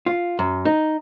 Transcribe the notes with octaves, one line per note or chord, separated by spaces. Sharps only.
F4
F#2
D#4